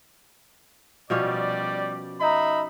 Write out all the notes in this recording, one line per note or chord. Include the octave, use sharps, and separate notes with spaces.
B2 F3 G3 C#4 D5
D#4 D#5 E5 A#5 B5